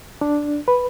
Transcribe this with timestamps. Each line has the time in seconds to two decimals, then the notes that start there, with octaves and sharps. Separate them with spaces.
0.21 D4
0.68 B4